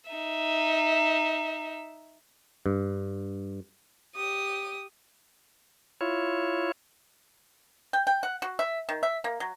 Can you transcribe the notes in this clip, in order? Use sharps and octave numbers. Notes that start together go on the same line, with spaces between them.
D#4 E5
G2
G4 D#6
E4 F4 C#5
G5
G5
F#5
F#4
E5
D#3
E5
A#3
F#3